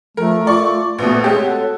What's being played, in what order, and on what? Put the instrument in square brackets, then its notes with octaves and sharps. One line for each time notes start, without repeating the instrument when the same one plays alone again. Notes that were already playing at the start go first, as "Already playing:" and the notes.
[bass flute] F3 [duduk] A3 [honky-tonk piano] A#4
[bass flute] F4 [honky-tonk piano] D5 C#6
[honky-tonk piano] A#1 B2 [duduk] A3 [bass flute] B4
[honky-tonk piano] G#3 C4 G4 [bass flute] C#5
[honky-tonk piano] F#4 [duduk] A4